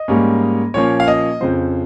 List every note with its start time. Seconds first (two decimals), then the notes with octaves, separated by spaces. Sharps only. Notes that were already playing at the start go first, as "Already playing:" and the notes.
Already playing: D#5
0.08 G#2 G3 A#3 C#4
0.74 A#2 F3 A#3 C#4 C#5
1.00 F5
1.08 D#5
1.40 F2 C#3 F3 C5